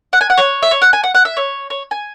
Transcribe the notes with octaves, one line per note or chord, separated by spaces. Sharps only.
F#5
G#5
F#5
C#5
E5
C#5
F#5
G#5
F#5
F#5
E5
C#5
C#5
G#5